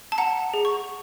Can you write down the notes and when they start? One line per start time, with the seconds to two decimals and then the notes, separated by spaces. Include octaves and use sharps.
0.12 A5
0.18 F#5 A#5
0.54 G#4
0.65 C#6